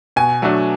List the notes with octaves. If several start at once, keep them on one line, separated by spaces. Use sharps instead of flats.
B2 G#5
F#3 A3 D4